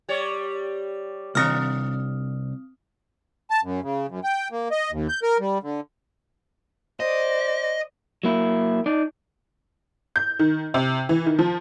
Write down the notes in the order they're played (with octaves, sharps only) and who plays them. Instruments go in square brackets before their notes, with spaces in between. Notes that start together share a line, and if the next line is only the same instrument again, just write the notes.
[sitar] G3 C#5 D5
[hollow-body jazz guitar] C2 A#5 [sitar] D#3 D4 [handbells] C4 D#6 F6
[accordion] A5
F#2
C#3
F#2
G5
A#3
D#5
D#2
G6
A#4
G3
D3
[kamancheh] C5 D5 [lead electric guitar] D#5
[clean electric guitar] F#3 A#3 E4
D#4 D5
[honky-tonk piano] G6
D#3
C3
E3
D#3
F3